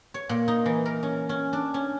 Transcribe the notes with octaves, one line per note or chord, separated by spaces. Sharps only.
C#5
A#2
D#4
E3
A#4
C#4
C#4
D4
C#4